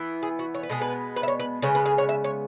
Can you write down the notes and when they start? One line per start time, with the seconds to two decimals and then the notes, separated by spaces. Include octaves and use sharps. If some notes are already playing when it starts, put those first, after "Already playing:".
Already playing: E3 B3
0.23 G#4
0.39 F#4
0.54 C#5
0.63 B4
0.69 B2 G#3 B3 G#4
0.81 B4
1.16 B4
1.23 E5
1.28 C#5
1.40 B4
1.62 C#3 G#3 B3 C#5
1.75 B4
1.85 G#4
1.98 C#5
2.09 E5
2.24 C#5